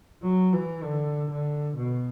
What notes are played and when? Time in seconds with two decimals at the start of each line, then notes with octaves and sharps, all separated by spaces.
0.22 F#3
0.53 E3
0.84 D3
1.30 D3
1.76 B2